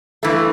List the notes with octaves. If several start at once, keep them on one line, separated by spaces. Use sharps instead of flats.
G2 E3 A3